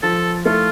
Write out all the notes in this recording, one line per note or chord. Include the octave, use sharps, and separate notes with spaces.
F3 A4
A3 E4 F4 A4